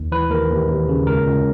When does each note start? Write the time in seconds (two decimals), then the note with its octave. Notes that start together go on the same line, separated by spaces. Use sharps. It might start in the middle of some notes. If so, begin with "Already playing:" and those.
Already playing: D#2
0.12 E3 B4
0.30 D#2 A#4
0.50 D#2
0.69 D#2
0.89 C#3
1.07 C#2 A#4
1.26 C#2